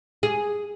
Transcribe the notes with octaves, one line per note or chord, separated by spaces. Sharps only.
G#4